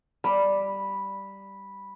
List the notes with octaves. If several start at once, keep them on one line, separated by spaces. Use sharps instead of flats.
G3 B5